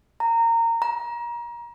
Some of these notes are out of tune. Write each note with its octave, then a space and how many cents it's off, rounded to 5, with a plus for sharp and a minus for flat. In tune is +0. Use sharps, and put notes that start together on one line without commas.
A#5 -20
A#5 +30